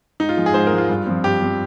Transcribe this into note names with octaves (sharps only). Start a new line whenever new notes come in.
G#2 D#4
F4
F3 G#3
G#4
G#2 C5
A#4
F3 G#3
F4
G2
F3 C4
G2 G4
F3 C4